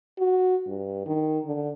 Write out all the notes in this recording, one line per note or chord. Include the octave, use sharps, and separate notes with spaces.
F#4
G2
D#3
D3